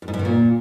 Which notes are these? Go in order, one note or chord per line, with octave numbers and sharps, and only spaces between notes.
F#2
G#2
F#2
D#3
A#2